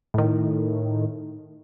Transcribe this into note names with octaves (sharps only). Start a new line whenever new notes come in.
A2 D#3